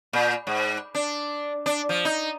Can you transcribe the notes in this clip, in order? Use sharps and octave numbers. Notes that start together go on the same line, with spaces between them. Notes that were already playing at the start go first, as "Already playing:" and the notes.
A#2
G#2
D4
D4
F3
D#4